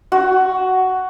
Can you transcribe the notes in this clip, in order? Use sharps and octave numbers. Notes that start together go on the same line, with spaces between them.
F#4